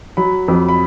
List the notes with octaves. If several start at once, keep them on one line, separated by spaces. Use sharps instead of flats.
F#3 B5
F2
B5